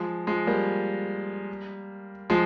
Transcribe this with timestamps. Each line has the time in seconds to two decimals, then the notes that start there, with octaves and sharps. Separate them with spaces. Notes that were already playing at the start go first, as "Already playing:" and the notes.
Already playing: F3 G#3
0.27 F3 G#3
0.47 G3 A#3
2.30 F3 G#3